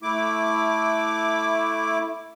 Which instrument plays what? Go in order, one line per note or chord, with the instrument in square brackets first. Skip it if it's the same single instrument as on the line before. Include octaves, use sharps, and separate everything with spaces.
[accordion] A3 E4 D6